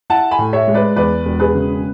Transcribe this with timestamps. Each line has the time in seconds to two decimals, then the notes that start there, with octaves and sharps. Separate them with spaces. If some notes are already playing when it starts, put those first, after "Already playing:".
0.10 E4 F#5 A5
0.31 G#5 B5
0.39 A2
0.53 C#5 E5
0.67 G#3
0.74 B4 D5
0.96 E2 B4 D5
1.25 E1
1.39 G#4 B4
1.54 C#3